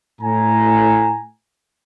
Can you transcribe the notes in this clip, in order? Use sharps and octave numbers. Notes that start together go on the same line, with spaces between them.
A2 G#5 A#5